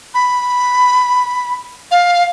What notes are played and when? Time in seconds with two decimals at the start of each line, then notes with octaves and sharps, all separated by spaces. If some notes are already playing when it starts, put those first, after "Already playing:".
0.14 B5
1.91 F5